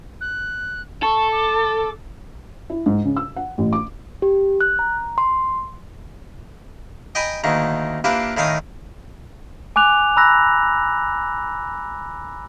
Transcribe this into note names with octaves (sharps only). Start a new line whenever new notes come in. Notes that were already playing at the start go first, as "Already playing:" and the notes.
F#6
A4 C#6
D6
E4
G#2
C#3
E6
F#5
A1
D6
G4
F#6
A#5
C6
D#5 G5 G#5 A#5 B5 D#6
D2 D#3 A#3
A#3 D4 E4 F4 G4 B4
A2 D#3 F5 G#5 A#5 D#6
G#5 D6 F#6 F7
A#5 B5 E6 F#6 A#6